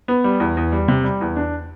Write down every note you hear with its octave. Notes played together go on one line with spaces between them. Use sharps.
B3
G3
E2
E2
G3
C3
G3
E2
D4